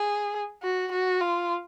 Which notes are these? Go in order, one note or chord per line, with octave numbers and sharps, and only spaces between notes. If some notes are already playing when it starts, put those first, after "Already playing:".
Already playing: G#4
F#4
F#4
F4